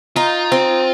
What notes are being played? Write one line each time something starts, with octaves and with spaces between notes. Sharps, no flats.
D#4 F4
C4